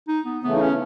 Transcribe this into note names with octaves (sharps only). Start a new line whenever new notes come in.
D#4
B3
C#3 E3 A3 B3
D#4
C#4